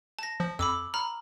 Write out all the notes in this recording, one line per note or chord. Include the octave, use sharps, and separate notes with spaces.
A5 A#6
F3
F2 B5 D6 E6
A#5 B5 F6